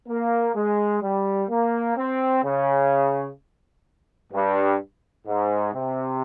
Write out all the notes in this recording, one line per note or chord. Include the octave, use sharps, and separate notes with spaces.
A#3
G#3
G3
A#3
C4
C#3
G2
G#2
C3